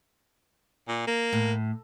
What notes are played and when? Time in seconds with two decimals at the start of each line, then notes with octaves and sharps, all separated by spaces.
0.88 A#2
1.07 A#3
1.33 A2